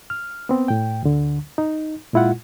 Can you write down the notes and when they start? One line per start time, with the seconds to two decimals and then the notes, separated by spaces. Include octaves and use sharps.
0.10 F6
0.49 B3 C4
0.68 A2 G5
1.03 D2 D3
1.58 D#4
2.13 A#2 G#3 E4 F4 F#5